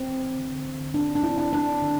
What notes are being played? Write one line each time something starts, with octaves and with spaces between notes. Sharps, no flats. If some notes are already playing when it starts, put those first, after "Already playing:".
Already playing: C4
E3
D3
D3
C4 D4
D4
C4 E4
D4
C4 D4
D3